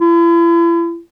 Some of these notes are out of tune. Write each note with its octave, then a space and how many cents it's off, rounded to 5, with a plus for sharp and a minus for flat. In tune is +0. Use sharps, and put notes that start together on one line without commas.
E4 +40